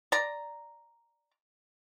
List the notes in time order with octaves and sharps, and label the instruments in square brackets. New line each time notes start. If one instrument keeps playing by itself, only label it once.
[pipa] D5 A#5